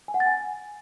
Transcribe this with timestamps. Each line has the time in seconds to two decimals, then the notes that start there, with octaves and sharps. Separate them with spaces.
0.08 G#5
0.14 F#5
0.20 A6
0.26 G#5